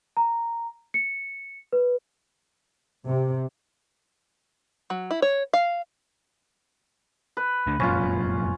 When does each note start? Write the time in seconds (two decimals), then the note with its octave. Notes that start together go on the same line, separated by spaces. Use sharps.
0.17 A#5
0.94 C#7
1.73 B4
3.07 C3
4.90 F#3
5.11 E4
5.22 C#5
5.53 F5
7.37 B4
7.67 D2 D3
7.80 F1 F#2 A#2 C#4 F4